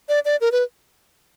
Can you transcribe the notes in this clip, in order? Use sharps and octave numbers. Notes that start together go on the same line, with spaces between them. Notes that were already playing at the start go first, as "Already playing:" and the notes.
D5
D5
A#4
B4